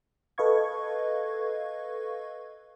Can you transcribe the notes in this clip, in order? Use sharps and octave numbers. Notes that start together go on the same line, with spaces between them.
A4 B4 D#5 F5 C#6 G#6